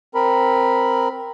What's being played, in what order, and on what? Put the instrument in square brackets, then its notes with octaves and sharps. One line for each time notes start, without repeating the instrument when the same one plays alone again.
[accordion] C4 A#4 B5